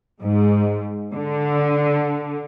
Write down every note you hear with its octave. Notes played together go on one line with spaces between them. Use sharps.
G#2
D3